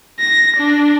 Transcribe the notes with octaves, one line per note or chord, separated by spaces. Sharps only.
A#6
D4